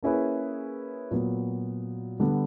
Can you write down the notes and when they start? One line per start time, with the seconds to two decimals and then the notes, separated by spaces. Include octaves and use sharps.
0.03 A#3 C#4 E4 G#4 B4
1.11 A#2 F#3 B3
2.20 D3 G3 B3 D4